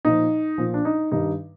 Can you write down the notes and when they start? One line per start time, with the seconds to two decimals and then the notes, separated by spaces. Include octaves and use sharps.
0.05 A#2 F3 D#4
0.58 A#2 F3
0.74 D4
0.85 D#4
1.11 G2 D#3 G3 D#4